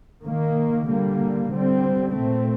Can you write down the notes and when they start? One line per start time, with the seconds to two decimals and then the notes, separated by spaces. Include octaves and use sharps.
0.24 D#3 A#3
0.87 D3 G3 A#3
1.50 D3 G3 C4
2.13 A#2 A3 C4